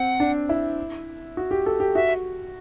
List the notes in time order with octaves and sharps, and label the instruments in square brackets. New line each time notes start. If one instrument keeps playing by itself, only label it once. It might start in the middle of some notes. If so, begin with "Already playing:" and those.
Already playing: [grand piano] C4 [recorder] F#5
[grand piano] D4
E4
F#4
G4
A4
G4
[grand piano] F#4 [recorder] E5